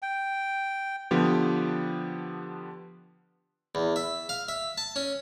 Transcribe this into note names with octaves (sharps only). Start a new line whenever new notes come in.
G5
D3 F3 B3 G4
E2
E5
F5
E5
A5
C#4